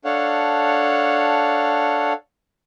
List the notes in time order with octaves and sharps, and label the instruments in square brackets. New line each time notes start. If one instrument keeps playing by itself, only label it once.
[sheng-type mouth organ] D4 A4 C#5 F5 F#5